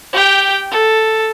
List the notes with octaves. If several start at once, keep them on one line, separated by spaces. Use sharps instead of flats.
G4 G5
A4